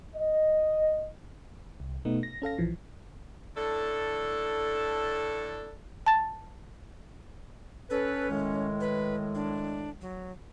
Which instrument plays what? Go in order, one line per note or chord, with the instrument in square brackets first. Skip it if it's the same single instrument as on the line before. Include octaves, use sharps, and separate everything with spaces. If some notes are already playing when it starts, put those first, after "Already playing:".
[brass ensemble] D#5
[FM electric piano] C2
B2 A3 B3 D#4
A#6
C#4 A4 F5 A#6
A#1 E3 F3
[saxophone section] A2 D4 A4
[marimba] A5 A6
[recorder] C#4 [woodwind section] A4 B4
[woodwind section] A2 D#3 G#3
[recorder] B4
D4
F#3